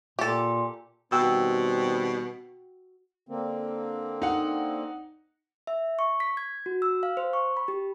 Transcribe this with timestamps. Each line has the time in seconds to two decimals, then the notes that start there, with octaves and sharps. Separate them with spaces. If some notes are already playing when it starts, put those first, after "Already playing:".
0.19 A#2 G4 A4
1.12 B2 D#3 G3 C4 F#4 G5 E6
3.29 D3 A#3 C4
4.22 D#4 F#5
5.67 E5
5.99 C#6
6.20 B6
6.37 G#6
6.66 F#4
6.82 E6
7.03 F5
7.17 C5
7.33 C#6
7.57 B5
7.68 G4